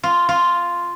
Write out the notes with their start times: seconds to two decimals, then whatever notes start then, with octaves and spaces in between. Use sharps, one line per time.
0.03 F4
0.29 F4